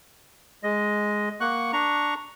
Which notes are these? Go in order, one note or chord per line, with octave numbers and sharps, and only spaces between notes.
G#3 D#5
A#3 F#5 C#6 F#6
D4 A#5 C#6